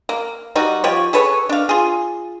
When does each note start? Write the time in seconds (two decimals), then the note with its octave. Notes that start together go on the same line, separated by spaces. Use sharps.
0.09 A#3
0.55 G3 D#4 F#4
0.84 F3 G4 C#5
1.13 G#4 A4 B4 C#5
1.49 D4 F5
1.69 F4 G#4